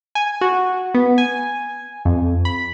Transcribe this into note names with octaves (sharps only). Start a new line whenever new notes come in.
G#5
F#4
B3
G#5
F2
B5